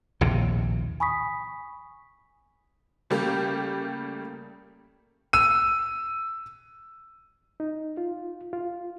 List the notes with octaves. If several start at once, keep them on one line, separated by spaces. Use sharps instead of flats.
A#1 D#2 A2 C3
G#5 B5 C#6 D#6 B6
C#3 G3 A3 A#3 G4
E6 D#7
D#4
F4
F4